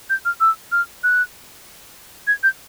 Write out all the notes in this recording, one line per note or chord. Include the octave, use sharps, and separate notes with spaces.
G6
F6
E6
F6
F#6
G#6
G6